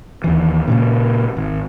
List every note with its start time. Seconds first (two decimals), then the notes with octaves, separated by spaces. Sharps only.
0.24 D#2 E3
0.68 A#2 C#3 A#3
1.37 G#1